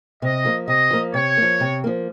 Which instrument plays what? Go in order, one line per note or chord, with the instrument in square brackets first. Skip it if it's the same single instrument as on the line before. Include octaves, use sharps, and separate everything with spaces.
[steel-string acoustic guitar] C3 [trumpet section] D#5
[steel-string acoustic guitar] F3 A#3
[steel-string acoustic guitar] C3 [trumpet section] D#5
[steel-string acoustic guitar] F3 A#3
[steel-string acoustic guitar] C3 [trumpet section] C#5
[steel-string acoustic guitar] F3 A#3
C3
F3 A#3